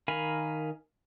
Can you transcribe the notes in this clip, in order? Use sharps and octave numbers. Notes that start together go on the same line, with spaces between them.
D#3 A#4 F5 G#5 B5